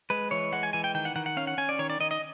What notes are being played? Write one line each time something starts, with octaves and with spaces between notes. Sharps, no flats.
G#3 B4
E3 C#5
G#3 F#5
G#5
E3 G#5
G5
D#3 G5
F#5
D#3 F#5
F#5
C#4 F5
F#5
C#4 G#5
D5
D#3 C#5
D5
D#3 D#5
D#5